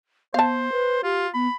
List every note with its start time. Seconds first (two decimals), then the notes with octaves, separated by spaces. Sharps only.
0.34 B3 C5 F5 A5
0.72 B4
1.04 F4 G4
1.34 B3 B5